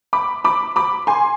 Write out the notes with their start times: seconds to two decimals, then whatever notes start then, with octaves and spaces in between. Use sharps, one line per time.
0.13 B5 D6
0.45 B5 D6
0.76 B5 D6
1.07 G#5 C6